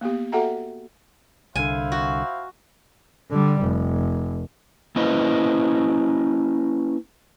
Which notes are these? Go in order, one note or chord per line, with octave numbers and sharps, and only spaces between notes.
A#3 B3 G4
F#4 A4 E5 F#5 G5 A#5
C2 D3 E4 C5 F5 G#5
F#4
D3 G3
F1
A#3 C#4 E4 B4 C5 D#5